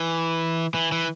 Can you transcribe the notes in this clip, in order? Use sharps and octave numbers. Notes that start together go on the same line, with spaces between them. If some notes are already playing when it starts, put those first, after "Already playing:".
Already playing: E3
E3
E3